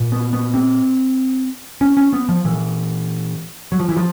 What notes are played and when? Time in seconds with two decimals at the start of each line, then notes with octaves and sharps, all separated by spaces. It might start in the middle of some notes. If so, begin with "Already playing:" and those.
Already playing: A#2
0.12 B3
0.33 B3
0.54 C4
1.81 C#4
1.97 C#4
2.13 B3
2.29 F3
2.45 A#2 E3
3.72 F#3
3.80 F3
3.89 E3
3.97 F3